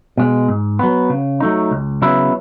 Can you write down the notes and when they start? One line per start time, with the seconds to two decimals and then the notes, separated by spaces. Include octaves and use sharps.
0.17 B2 G#3
0.49 G#2
0.79 F#3 B3
1.10 C#3
1.40 F#3 A3 D#4
1.71 C#2
2.02 C#3 F#3 B3 E4